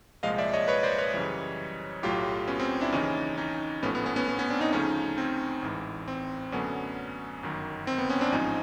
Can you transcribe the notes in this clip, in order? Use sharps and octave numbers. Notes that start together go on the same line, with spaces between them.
C2 A#2 F3 G#3 D#5 F5
D5 E5
C#5 D#5
B4 C#5
C5 D5
B4 C#5
F#2 C#3 E3 G3
B1 A2 F#3 A3 F4 G4
B3 C#4
C4
D4 E4
D#2 C#3 E3 C#4 D#4
C#4 D#4
A#1 A2 F3 A3 B3 C#4
B3
B3 C#4
B3 C#4
B3
B3 C#4
C4 D4
C#4 D#4
D2 C#3 F3 A3 C#4 D#4
C4
A1 G#2 E3
C4
F#2 D3 F#3 A3 B3 C#4
G1 F#2 D#3
C4
B3
B3 C#4
C4 D4
A1 G#2 F3 C#4 D#4